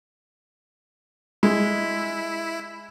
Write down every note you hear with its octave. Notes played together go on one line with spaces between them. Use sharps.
G#3 E4